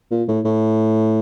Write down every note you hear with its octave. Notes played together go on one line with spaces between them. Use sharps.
A#2
A2
A2